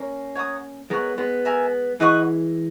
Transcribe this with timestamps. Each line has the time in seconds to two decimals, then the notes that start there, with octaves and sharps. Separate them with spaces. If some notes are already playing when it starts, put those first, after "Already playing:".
Already playing: A#3 C#4
0.35 C#5 F#5 A#5 D#6
0.90 G#3 B3 A#4 C#5 F#5
1.18 G#3 B3
1.45 A#4 E5 G#5
2.00 E3 G#3 B4 D#5 F#5 C#6